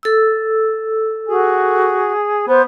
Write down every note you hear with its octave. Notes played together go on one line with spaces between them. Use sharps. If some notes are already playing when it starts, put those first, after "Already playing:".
A4 E6
F#4 G#4
B3 C5